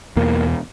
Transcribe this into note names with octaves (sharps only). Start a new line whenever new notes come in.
E2 B2 A#3